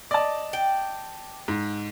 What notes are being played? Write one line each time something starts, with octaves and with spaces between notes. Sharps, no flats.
D5 D#5 A5
G5
G#2